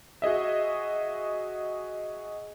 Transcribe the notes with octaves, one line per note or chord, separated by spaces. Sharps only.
F#4 G#4 D#5 E5